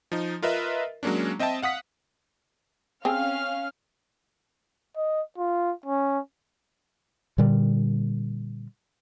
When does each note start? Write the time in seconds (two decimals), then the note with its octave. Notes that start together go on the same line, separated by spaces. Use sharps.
0.12 F3 D#4
0.42 F4 A#4 B4 D#5 E5
1.03 F#3 G#3 A#3 C#4 D4
1.39 C4 D#5 E5 G5 A5
1.62 F5 F#5 D#6 B6
3.05 C4 C#4 G#4 F5 F6
4.97 D#5
5.38 F4
5.86 C#4
7.38 A#2 D3 G3